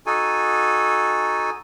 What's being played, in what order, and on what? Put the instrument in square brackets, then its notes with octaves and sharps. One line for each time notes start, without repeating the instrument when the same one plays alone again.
[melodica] D#4 F#4 A4 G#5